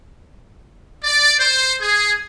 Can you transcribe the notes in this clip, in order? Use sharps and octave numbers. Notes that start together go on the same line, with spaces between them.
D5
C5
G#4